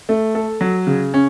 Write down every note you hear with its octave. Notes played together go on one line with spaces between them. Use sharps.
A3
A4
F#3
C#3
C#4